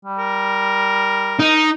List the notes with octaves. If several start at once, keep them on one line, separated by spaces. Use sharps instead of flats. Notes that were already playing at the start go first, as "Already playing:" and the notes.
G3
A#4
D#4